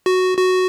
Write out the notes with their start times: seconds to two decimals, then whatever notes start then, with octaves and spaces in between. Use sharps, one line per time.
0.06 F#4
0.37 F#4